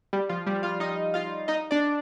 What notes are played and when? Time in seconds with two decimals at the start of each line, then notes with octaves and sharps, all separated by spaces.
0.13 G3 G4
0.29 F3 F4
0.46 G3 G4
0.63 F4 F5
0.80 D#4 D#5
1.14 F4 F5
1.48 D#4 D#5
1.71 D4 D5